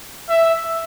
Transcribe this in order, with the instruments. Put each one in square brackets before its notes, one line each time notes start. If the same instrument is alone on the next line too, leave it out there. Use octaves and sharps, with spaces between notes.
[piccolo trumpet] E5